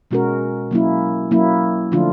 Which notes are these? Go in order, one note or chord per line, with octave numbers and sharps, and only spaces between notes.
B2 G#3 C#4 F#4 A#4
F#3 A#3 C#4 E4
F#3 A#3 C#4 E4
D3 F3 A3 D4 F4